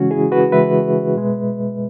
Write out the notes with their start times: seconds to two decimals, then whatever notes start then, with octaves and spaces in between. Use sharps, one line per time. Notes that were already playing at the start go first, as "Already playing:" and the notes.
Already playing: C#3 E3 G#3 C#4 F#4
0.11 E4 G#4
0.32 F#4 B4
0.52 C#3 E3 G#3 B4 E5
1.16 B2 G#3